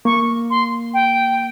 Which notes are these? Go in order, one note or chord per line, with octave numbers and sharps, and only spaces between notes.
A#3 C#6
C6
G5